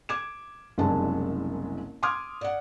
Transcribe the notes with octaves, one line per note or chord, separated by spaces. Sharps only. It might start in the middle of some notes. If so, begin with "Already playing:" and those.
D6 G#6 E7
F#1 C2 F#2 G#3 D4 A5
C6 D6 D#6 F6 G#6
D5 F#5